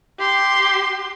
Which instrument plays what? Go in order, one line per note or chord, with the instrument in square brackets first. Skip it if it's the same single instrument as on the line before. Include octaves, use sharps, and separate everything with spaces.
[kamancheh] G4 C6